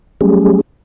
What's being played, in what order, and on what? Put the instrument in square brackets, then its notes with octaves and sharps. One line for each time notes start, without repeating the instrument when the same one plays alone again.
[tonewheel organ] F#3 G3 A3 C#4 G4 G#4